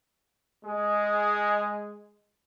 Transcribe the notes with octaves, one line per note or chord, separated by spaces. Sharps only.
G#3 G#4